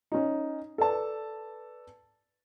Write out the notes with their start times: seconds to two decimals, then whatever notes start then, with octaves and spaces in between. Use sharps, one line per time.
0.12 C#4 D#4
0.78 A4 B4 D5 A5